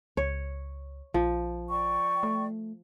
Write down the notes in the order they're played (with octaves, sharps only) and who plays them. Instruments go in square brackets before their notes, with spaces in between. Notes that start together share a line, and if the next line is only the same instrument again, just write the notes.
[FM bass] C#2 [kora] C#5
[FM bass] A#1 [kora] F3
[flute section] D5 G5 C#6
[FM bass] A3